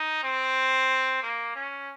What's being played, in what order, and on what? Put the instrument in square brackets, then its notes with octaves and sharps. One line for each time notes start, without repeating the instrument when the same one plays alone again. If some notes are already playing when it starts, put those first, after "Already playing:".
Already playing: [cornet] D#4
C4
A#3
C#4